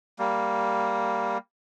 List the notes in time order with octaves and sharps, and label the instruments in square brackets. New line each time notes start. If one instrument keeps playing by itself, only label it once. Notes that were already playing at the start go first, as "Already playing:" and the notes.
[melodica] G3 A#3